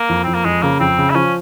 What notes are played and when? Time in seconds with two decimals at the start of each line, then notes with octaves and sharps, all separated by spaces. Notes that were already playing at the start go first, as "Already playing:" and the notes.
Already playing: A#3
0.09 F2
0.24 F2 C4
0.34 A#3
0.45 F2 G#3
0.62 C#3 A#3
0.80 F2 C4
0.98 C#3
1.10 E4
1.15 F3 C#4